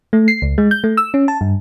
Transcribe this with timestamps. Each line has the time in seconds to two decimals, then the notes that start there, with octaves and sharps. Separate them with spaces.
0.13 A3
0.28 C7
0.42 C#2
0.58 G#3
0.71 G6
0.84 A3
0.97 E6
1.14 C#4
1.28 A5
1.41 G2